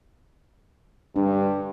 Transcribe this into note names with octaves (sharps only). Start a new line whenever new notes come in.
G2 D4